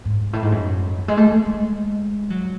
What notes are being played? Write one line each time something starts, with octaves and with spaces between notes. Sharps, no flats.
G#2
A2
G#2
F#2
F#3
G#3
A3
G#3
G#3
F#3